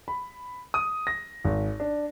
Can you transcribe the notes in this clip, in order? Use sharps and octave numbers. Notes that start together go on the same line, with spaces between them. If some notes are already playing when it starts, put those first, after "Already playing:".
B5
D#6
A#6
G#1
D4